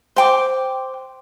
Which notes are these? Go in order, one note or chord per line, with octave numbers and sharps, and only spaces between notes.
C5 G5 D6